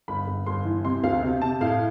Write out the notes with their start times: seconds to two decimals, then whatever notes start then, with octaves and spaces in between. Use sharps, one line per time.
0.08 G1 B5
0.27 G1
0.46 G1 C6
0.65 E3
0.85 C3 C6
1.03 D2 F5
1.23 C3 F5
1.41 C3 A5
1.61 A2 F5